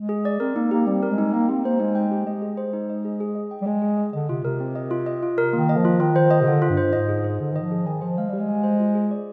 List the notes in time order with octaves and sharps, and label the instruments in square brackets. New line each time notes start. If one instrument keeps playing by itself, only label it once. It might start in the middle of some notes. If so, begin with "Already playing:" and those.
Already playing: [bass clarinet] G#3
[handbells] G#4
D5
[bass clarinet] C4 [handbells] A#4
[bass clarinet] A#3 [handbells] D#4
[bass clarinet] A#3 [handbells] G4
[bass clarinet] G3 [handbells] C4
[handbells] A#4
[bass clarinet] G#3
[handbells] D#4
[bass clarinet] A#3 [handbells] G5
[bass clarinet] C4 [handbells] G4
[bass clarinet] A#3 [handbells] C5
[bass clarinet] G#3 [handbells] D#4
[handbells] G5
G4
[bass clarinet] G#3 [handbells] D#5
[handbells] G#4
C5
D#4
D#5
G#4
G#4
D#5
G5
[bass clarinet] G3
[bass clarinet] G#3 [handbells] G#4
[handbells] G#4
D#5
[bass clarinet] D3 [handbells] D#5
[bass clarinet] C3 [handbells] F4
[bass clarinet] C3 [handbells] A#4
[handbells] C4
D#5
F4
D#5
F4
A#4
[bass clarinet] D#3 [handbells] A#3
[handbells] D#5
[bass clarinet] F3
[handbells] F4
[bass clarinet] D#3 [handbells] F4
[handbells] C5
D#5
[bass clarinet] C3
[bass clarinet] D3 [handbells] F4
[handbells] F4
[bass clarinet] G2
[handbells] C5
[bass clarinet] G#2 [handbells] D#5
[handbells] G#4
C5
[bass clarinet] D3 [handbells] D#4
[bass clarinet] D#3 [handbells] D#5
[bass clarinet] F3
[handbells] G#4
[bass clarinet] D#3 [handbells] G#5
[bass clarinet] F3 [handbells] C5
[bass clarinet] G#3 [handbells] F5
[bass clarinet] G3 [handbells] G4
[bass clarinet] G#3
[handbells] G#5
C5
F4
G#4
D5